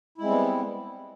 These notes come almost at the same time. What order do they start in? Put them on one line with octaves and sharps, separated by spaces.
E4 G#3 C4 G3 B3